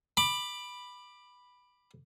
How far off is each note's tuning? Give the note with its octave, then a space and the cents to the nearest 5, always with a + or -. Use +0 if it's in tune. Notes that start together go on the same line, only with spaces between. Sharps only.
B5 +0 D6 +20